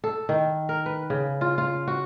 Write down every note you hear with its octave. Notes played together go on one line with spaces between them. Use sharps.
A4
D#3
A#4
B4
C#3
F4
F4
F#4